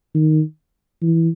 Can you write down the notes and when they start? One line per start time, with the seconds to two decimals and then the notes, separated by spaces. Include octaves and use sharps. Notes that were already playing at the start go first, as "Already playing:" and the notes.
0.14 D#3
1.02 E3